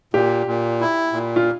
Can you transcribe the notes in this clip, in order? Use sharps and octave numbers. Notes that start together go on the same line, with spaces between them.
A#2 G4
A#2
E4
A#2
F4